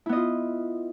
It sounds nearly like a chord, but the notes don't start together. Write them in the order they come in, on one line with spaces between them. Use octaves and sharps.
E4 B3 D#5 F4